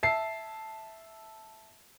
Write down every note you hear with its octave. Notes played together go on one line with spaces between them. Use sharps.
E5 A5 C7